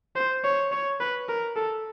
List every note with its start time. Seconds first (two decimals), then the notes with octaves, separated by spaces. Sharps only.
0.16 C5
0.44 C#5
0.72 C#5
1.01 B4
1.29 A#4
1.56 A4